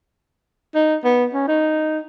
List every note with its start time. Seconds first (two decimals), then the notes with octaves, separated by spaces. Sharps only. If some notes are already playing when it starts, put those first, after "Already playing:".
0.75 D#4
1.04 B3
1.33 C#4
1.48 D#4